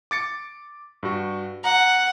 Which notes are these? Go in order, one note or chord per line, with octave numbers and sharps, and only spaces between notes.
D6 A6 C#7
G2 F#4
F#5 A#5